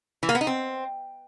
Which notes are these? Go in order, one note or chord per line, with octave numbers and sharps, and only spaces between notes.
E3
A#3
B3
D#4
C4